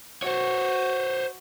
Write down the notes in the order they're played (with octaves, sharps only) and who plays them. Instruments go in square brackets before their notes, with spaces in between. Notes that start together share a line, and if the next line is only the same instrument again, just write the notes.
[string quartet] F#4 [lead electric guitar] C5 C#5